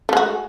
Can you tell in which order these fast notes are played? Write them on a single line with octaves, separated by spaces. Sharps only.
A3 G#3 F#4